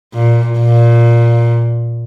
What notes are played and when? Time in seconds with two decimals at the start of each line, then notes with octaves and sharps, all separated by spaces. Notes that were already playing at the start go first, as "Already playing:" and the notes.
0.14 A#2
0.58 A#2